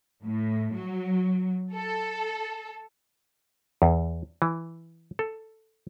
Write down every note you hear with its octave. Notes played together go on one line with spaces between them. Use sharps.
A2
F#3
A4
E2
E3
A4